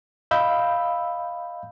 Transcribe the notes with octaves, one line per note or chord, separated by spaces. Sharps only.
D#5 F5 B5 E6 G6